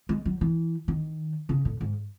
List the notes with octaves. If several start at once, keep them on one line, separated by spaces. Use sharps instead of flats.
G#3
F#3
E3
D#3
C#3
A2
G#2